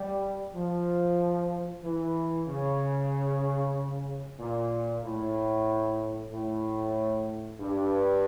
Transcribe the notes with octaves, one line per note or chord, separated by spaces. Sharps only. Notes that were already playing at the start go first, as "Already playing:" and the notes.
Already playing: G3
F3
E3
C#3
A#2
A2
A2
G2